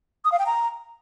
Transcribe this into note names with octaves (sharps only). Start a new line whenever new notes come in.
D#6
F5
G5
A#5